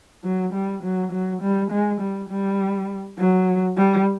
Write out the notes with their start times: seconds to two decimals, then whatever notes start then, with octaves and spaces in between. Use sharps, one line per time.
0.24 F#3
0.53 G3
0.83 F#3
1.12 F#3
1.42 G3
1.71 G#3
2.01 G3
2.29 G3
3.19 F#3
3.77 G3